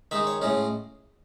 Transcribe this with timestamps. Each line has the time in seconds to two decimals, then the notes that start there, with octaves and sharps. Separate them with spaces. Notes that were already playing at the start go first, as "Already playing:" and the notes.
0.11 D#3 G#3 D#4 E5
0.27 C#5
0.42 A2 G#3 C#4